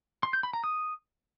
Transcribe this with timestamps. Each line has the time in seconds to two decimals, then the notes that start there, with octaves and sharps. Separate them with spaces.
0.23 C6
0.33 G6
0.43 B5
0.53 A#5
0.64 D#6